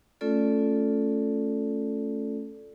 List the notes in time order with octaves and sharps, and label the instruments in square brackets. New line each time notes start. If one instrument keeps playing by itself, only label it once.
[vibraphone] A3 C#4 F4 A4 D5